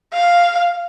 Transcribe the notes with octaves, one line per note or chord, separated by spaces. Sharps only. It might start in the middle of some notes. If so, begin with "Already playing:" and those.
F5